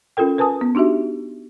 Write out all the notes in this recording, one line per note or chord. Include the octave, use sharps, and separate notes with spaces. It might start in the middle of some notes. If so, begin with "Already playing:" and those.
C#4 F4 A4 A#4 G5
A#4 B4 G#5 A5 D#6
B3
D4 D#4 F#4 G4 E5